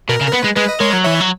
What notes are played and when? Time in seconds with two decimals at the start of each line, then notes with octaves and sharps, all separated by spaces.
0.09 B2 A#4
0.21 C#3
0.28 A#4
0.32 B3 B4
0.44 G#3
0.57 G#3 B4
0.69 D#5
0.80 G#3 A#4 C#5
0.93 F#3
1.04 E3 C#5 E5
1.21 F#3